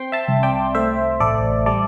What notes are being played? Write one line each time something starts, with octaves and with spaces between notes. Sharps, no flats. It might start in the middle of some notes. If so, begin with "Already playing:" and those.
Already playing: C4 G5 C6
E5 A5
C2
D5 G5
A3 C5 E5
A1 A4 D5
G3 A4 D5